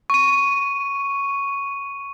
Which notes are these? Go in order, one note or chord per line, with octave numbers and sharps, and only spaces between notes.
C#6 D#7